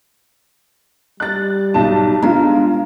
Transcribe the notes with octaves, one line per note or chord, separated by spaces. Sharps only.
G3 F#6 A6
B1 D#4 A5
G#3 B3 D4 F4 A#5